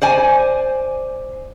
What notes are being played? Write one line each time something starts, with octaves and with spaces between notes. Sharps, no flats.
C5 D5 G#5